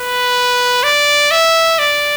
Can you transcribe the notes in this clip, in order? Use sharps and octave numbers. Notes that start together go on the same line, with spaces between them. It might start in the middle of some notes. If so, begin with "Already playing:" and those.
Already playing: B4
D5
E5
D5